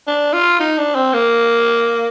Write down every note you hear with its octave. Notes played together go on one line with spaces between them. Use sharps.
D4
F4
D#4
D4
C4
A#3